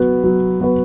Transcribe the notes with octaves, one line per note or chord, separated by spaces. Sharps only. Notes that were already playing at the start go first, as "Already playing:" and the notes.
Already playing: F#3 B3 F#4 B4
F#3
B3 F#4 B4